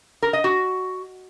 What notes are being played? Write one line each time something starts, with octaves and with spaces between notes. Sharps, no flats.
A#4
D#5
F#4